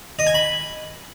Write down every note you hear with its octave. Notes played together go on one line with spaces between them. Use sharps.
D#5
G#5
B5